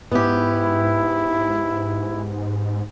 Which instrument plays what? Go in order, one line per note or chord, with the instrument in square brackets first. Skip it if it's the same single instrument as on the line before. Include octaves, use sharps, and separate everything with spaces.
[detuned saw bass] G#2 [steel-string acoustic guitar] B3 G4 [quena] E4